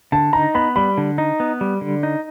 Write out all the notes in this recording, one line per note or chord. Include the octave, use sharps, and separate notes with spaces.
D3 A5
D#4 A#5
B3 B5
G3 B5
D3
D#4
B3
G3
D3
D#4